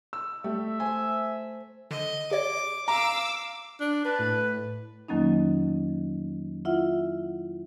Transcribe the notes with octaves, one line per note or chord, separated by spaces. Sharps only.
E6
G3 A3 E5
C5 G#5
D3 D#5
G4 C#5 D5 D6
F5 A#5 D6 E6
D4
B4 A5
A2
F2 D#3 F#3 A#3 C#4 D#4
E4 F4 E5 F#5